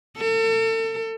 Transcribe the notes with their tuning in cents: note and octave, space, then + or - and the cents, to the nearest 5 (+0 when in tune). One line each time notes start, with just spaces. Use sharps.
A4 +35